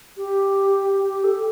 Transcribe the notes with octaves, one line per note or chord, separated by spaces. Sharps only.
G4
G4
A4